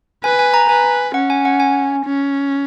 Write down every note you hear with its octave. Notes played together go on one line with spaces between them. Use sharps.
B4 G#5
G#5
A#5
B4 G#5
C#4 F#5
G#5
F#5
G#5
C#4